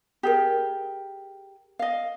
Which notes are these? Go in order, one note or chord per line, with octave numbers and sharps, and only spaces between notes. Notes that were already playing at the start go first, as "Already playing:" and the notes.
G4 G#4 A#4
D#5 F5